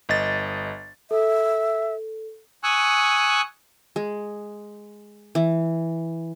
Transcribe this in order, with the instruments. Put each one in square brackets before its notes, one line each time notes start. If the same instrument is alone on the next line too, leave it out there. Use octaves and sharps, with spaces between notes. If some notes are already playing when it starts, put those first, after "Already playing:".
[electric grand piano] G1 D#5 A6
[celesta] A4 [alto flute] E5
[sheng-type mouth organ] G#5 C#6 D#6 E6 F#6
[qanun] G#3
E3